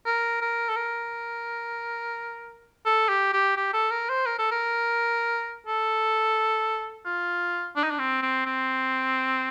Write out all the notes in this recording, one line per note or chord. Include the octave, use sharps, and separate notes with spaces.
A#4
A#4
A4
A#4
A4
G4
G4
G4
A4
A#4
C5
A#4
A4
A#4
A4
F4
D4
D#4
D4
C4
C4
C4